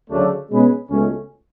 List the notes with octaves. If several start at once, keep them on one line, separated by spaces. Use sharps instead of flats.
D2 C#3 F#3 A3 D4
B2 G#3 C#4 G#4 B4
C#2 B2 A3 C#4